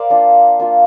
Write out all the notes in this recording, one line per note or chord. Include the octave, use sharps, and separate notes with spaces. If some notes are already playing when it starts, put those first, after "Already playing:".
Already playing: A#4 C5 D5 F5
A#3 D4 F4
A#3 D4 F4